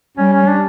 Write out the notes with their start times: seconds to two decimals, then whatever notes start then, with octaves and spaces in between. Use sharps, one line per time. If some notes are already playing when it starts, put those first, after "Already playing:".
0.17 G3 C#4
0.32 C#4
0.47 D4